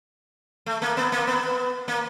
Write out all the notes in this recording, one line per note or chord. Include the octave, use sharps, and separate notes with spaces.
A3
A#3
B3
A#3
B3
A#3